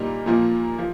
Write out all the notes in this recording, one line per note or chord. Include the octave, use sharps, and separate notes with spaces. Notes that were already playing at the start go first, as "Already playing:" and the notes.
Already playing: A#2 G3 A#3 D#4
A#2 F3 A#3
F3